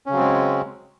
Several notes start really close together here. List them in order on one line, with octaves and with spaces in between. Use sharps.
C#4 C#3 F#3 C4 G#3